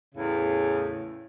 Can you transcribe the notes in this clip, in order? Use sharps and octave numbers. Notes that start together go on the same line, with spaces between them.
E2 A2 C#3